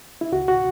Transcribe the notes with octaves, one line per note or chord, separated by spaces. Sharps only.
E4
C#2 F#4
F#4